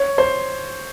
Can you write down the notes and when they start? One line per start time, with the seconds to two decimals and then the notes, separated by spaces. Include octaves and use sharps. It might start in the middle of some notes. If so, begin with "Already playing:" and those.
Already playing: C#5
0.18 C5